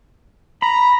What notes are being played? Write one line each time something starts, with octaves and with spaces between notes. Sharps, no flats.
A#5 B5